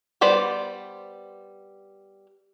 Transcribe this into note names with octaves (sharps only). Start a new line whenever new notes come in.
G3 B3 C5 D5